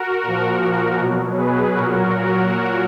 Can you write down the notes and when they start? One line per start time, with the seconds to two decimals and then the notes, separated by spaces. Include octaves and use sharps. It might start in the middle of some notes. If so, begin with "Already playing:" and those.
Already playing: F#4 A#4
0.23 A#2 F3
0.99 B2 F#3
1.37 G#4 B4
1.73 A#2 F#3 F#4 A#4
2.49 A#2 F#3